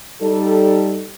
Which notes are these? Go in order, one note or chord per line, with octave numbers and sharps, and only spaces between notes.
G3 D#4 A4